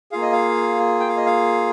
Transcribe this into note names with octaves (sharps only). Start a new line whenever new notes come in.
A#3 F4 G#4 F5
D#5
F5
G5
F5
D#5
F5